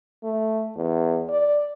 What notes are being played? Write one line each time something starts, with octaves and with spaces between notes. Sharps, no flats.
A3
E2
D5